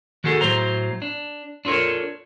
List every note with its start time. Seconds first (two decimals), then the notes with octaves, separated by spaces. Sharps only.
0.24 D#3 F#4 G#4 A4
0.41 A2 F#3 C5 A#5
1.02 D4
1.65 D4 F4 A4 A#4 C#5